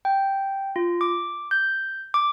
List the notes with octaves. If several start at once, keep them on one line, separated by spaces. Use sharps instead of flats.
G5
F4
D6
G6
D6